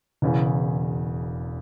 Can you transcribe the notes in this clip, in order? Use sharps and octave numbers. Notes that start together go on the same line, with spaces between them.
E1 E2 C#3